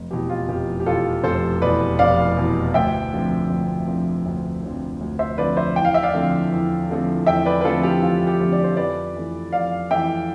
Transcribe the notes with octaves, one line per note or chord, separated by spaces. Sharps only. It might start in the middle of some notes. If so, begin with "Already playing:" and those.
Already playing: F1
E2 B2 G4
F4
F1 G4
G4
E2 B2 F4 A4
F1 A4 C5
E2 B2 B4 D5
F1 D5 F5
E2 B2
D2 E5 G5
D3 F3 C4
D2
D3 F3 C4
D2
D3 F3 C4
D2
C5 E5
D3 F3 C4 B4 D5
C5 E5
E2 G5
F5
E5
D5 F5
D3 F3 A3 C4
E2
D3 F3 A3 C4
E2 E5 G5
B4 D5
B4
D3 F3 A3 C4 F4 A4
G4
E2 F4
G4
D3 F3 A3 C4
D5
C5
F2 B4 D5
E3 A3
F2 D5 F5
E3 A3 E5 G5